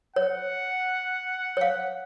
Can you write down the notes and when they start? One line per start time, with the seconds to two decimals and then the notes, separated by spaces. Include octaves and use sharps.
0.16 C#5 F#5
1.57 C#5 F5